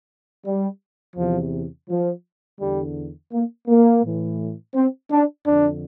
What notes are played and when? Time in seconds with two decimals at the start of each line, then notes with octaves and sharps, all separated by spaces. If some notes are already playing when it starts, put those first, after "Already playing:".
0.46 G3
1.16 E2 C3 E3 F3
1.89 F3
2.60 E2 D3 G3
3.33 A#3
3.68 A#3
4.04 A2 E3
4.75 C4
5.11 D4
5.47 F2 D3 D4